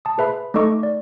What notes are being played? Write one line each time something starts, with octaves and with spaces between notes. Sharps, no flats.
A5 D#6
G#4 B4 E5 B5
A3 D#4 A4 D#5 C#6 D6
D5